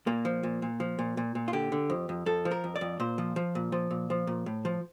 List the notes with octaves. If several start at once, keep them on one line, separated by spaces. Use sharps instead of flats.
A#2 A#3
F3
A#2
A#2
F3
A#2
A#2
A#2
F4
D3 G4
D3
F2
F2
F2 A4
F3
A#4
F2
D5
F2
A#2 C5
F3
F3
A#2
F3
A#2
F3
A#2
A2
F3